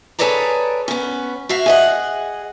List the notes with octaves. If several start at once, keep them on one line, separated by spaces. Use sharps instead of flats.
G#4 A4 B4 C#5 D5 A#5
B3 C#4
F#4 E5 F5
G#4 D#5 F#5